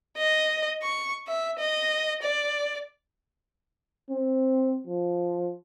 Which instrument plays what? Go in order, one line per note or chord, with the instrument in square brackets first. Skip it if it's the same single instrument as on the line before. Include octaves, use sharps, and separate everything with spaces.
[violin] D#5
C#6
E5
D#5
D5
[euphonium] C4
F3